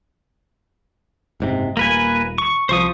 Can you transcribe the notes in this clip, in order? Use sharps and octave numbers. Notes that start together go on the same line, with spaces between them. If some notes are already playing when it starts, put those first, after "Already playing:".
F#1 G#2 C3
D#1 A#3 B4 G#5
C#6
C2 F3 C5 C#6 D#6